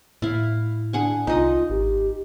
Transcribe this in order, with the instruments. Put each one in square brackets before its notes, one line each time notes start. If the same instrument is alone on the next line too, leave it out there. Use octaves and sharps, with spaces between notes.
[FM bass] A2 [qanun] E4 F5
[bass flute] D4 [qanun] G#4 F#5 G#5
[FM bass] C2 [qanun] D#4 D#5 [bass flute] F4
[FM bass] G#1 [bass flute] G4